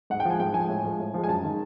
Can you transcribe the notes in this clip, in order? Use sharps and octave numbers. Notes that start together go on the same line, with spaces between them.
G#2 F#5
G5
F3 G#3 G#5
G#2 G5
F3 G#5
G#3
A2
F3 G#3
A2
F3 G#3
G#5
F#2 A5
D#3 G#3